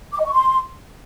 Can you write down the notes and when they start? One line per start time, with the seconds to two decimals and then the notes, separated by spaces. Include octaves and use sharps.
0.13 D6
0.19 D#5
0.25 C#6
0.32 C6